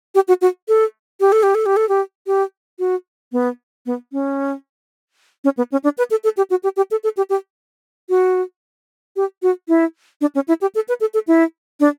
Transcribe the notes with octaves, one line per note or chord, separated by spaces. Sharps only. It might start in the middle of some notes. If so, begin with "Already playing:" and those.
G4
F#4
F#4
A4
G4
A4
G4
A4
G4
A4
G4
G4
F#4
B3
B3
C#4
C#4
B3
C#4
D4
B4
A4
A4
G4
F#4
G4
G4
A4
A4
G4
G4
F#4
G4
F#4
E4
D4
C#4
E4
G4
A4
B4
A4
A4
E4
D4